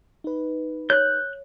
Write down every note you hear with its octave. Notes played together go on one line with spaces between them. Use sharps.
D#4 B4
C#5 F#6 G6